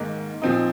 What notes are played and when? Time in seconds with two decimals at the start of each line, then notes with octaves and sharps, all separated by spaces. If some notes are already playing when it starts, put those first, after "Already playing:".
Already playing: G#2 D#3 A#3
0.42 A#2 F3 C4 D#4